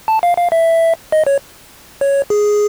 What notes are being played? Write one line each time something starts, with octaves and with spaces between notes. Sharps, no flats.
A5
F5
F5
E5
D#5
C#5
C#5
G#4